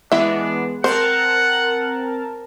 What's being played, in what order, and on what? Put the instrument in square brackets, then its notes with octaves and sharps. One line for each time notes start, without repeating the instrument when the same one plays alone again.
[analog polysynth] E3 G#3 B3 [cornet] D4 [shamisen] E4 E5
[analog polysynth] C4 A#4 A5 [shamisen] C5 [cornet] F#5